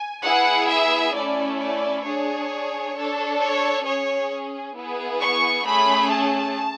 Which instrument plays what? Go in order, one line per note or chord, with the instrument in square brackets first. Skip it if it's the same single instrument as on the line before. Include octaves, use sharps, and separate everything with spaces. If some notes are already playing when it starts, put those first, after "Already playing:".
Already playing: [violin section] G#5
B3 E4 G#4 F#5
E5
A3 C#4 E4 D5
D5
D4 G#4 C#5
D4 A4
C#5
C#4 G#4 C#5
B3 E4 G#4
C#6
A3 C#4 G#4 B5
A5